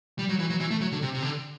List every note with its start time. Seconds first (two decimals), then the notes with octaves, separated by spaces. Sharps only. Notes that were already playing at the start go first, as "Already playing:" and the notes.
0.19 G3
0.29 F#3
0.40 E3
0.50 F#3
0.60 E3
0.71 A3
0.81 F#3
0.92 D3
1.02 C3
1.14 C3
1.23 D3